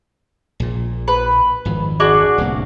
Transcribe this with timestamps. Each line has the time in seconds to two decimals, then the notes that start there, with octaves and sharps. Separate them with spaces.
0.60 A#1 A#2
1.08 B4
1.65 G#1 F2
2.00 D4 F#4 G#4
2.38 D1 C2 A#3